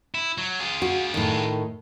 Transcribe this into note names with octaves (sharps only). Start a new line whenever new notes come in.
E4
F#3
F4 G#4
F#4
A2 D#3